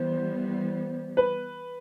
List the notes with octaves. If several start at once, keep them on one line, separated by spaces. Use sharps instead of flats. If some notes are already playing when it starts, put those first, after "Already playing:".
Already playing: E3 G3 B3 C5
B4